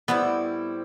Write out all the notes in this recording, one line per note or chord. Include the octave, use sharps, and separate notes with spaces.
A2 G3 B3 C4 E4